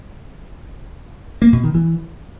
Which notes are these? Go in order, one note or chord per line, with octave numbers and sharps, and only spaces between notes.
A#3
B2
D#3
E3